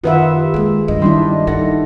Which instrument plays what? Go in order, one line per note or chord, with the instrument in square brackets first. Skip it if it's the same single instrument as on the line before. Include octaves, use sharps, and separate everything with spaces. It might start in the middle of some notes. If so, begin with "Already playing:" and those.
[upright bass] F#2 [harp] D#3 [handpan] F4 B4 E5 [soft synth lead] F#5
[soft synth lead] G4
[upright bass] G#3 A#3 [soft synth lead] G#4
[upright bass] G2 [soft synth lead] D#5
[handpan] D#3 D4 E4 [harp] G3 E5 C6
[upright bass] G2 [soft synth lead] D#4 [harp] A4 F#5 A#6